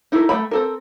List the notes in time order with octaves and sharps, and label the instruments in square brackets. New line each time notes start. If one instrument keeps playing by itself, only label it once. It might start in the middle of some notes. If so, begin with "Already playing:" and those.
[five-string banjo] D#4 E4 G4 A4 A#4
A3 E5 G5 B5
C4 A4 A#4